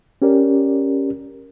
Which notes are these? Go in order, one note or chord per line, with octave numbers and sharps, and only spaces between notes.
C#4 G4 A#4 D5